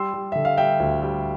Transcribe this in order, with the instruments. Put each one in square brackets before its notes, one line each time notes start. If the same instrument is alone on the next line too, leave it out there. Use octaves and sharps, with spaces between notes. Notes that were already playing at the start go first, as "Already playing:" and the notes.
Already playing: [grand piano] G3 C6 E6
G3
D3 E5
F5
G3 E5 G5
D2
G3